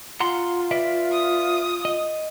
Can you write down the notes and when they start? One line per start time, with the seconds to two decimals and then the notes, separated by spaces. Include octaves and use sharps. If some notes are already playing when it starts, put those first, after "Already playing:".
0.20 F4 F#5 A#5 C6
0.71 B4 D5 E5
1.11 D#6
1.85 D#5